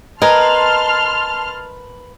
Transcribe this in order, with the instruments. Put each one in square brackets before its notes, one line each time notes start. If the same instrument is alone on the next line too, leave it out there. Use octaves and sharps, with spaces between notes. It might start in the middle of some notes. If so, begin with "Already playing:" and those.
[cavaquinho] A#4 B4 G#5 [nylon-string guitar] D#5 [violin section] A5 C6 F6